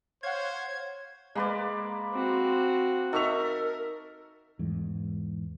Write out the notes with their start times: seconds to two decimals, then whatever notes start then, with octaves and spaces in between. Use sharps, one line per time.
0.23 C5 C#5 F5 F#5 G#6
1.35 G#3 A#3 B4 D5
2.14 C4 F#4
3.13 D#4 A4 A#4 E5 C#6 F7
4.59 E2 G#2